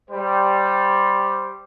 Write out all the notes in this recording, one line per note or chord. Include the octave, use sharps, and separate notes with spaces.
G3 C5